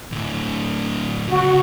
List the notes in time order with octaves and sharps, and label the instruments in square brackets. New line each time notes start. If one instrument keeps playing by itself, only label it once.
[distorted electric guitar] D2 A2
[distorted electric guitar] D2 C#3 [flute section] F#4